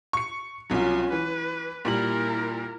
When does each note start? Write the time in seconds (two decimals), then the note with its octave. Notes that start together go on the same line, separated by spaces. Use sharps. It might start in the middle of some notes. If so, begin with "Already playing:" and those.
0.13 C#6 C#7
0.70 C2 F#3 C#4 F4
1.12 E3 B4
1.85 A#2 G3 E4 A#4 F#7